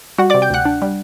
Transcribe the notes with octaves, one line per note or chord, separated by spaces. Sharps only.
G3 F#4 F#5
D5 D6
C3
G5 G6
D2 F#5 F#6
D4
G3